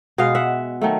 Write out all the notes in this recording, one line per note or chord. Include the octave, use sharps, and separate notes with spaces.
B2 G#3 D#5 F5
E5 F#5
D#3 F#3 A3